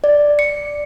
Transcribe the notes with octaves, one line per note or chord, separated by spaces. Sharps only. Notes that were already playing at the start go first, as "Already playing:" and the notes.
D5
C#7